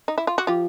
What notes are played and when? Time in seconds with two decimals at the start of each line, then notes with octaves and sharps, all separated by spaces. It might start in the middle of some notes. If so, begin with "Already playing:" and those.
0.08 D#4
0.18 E4
0.27 F4
0.38 F#4
0.47 F3 F4 G4